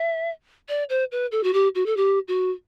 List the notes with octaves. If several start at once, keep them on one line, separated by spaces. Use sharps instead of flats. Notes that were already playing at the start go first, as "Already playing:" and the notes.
Already playing: E5
D5
C5
B4
A4
F#4
G4
F#4
A4
G4
F#4